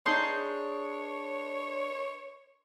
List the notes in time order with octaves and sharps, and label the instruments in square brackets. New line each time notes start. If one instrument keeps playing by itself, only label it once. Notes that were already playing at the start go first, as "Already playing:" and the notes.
[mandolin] D4 G#4 G6 [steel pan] D#4 C6 [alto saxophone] C#5